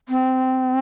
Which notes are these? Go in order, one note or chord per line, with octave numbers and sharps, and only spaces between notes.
C4